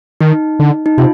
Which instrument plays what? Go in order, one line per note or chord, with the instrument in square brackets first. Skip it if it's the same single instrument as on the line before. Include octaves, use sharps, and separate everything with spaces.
[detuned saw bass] D#3 [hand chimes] D#4
[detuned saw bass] D3
[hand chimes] D#4
[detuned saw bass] C3 [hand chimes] F4